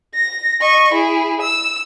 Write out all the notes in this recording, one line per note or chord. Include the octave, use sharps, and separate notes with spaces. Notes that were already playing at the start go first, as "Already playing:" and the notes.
A#6
D#5 C#6
E4 G#4
E6